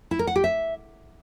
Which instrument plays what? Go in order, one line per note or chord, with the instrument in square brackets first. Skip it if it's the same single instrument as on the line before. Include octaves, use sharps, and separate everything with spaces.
[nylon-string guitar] E4
A#4
F#5
G4
E5